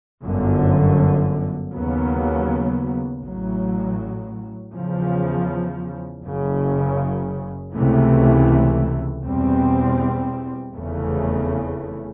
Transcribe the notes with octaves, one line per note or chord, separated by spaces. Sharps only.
G1 F#2 D3
D#2 C#3 F#3 B3
A1 A2 F#3
E2 C#3 F3
F#1 F#2 C#3
C#2 C3 E3 A3
E2 B2 G3 C4
F1 E2 C#3 E3 A3